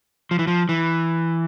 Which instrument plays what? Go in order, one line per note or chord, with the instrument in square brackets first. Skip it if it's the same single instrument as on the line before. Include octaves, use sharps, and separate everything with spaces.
[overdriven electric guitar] F3
E3
F3
E3